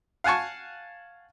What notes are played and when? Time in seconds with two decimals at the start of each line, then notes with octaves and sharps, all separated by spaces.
0.24 F5 F#5 G#5 A5 C#6